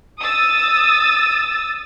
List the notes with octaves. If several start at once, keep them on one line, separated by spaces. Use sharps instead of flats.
D#6 E6 A6